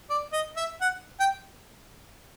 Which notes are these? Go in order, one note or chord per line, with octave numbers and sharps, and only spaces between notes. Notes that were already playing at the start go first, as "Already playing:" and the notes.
D5
D#5
E5
F#5
G5